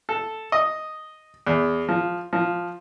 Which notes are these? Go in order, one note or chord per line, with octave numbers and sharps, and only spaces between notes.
A4
D#5
E2
F3
F3